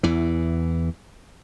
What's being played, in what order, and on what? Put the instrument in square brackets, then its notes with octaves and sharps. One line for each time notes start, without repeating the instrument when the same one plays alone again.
[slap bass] E2 E3